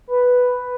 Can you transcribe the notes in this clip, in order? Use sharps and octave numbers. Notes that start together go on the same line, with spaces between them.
B4